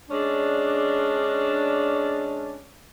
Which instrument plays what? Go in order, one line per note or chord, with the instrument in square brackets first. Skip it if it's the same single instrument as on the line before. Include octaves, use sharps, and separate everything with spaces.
[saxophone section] G#3 C#4 D4